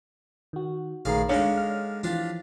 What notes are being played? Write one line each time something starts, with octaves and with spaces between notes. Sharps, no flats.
D#3 F#4
A#1 A2 D#3 G#4 A#4 F5
D3 G#3 D4 D#4 C#5 F5
F6
E3 F3 D4 F4 G4